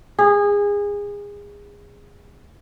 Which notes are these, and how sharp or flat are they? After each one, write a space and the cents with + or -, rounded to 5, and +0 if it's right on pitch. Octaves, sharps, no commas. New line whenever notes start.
G#4 -25